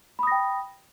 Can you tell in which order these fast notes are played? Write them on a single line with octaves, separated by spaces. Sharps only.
B5 D#6 A#6 G5